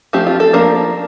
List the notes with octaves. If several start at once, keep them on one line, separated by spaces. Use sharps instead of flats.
F3 A3 C4 G4
F4
A4
F3 A#3 D4 A#4